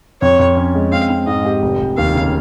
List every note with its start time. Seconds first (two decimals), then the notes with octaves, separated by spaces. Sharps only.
0.22 F2 C#5
0.39 F2
0.57 C#4
0.75 G#3
0.92 C4 F5
1.10 C4
1.27 G#2 D#5
1.45 G4
1.62 F1
1.80 F1
1.98 D#2 F5
2.15 C#3